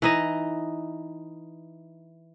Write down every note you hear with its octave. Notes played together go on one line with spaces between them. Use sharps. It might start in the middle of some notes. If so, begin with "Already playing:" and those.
E3 D#4 D#5